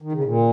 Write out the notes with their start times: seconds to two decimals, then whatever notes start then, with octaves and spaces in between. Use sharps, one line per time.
0.02 D#3
0.12 C#3
0.24 A#2